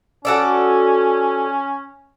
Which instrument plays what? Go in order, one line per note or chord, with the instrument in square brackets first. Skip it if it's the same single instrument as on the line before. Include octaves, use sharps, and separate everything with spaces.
[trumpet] C#4 [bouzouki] F#4 A4 D5